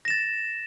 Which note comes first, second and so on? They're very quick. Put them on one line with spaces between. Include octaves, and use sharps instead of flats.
A#6 E7 A6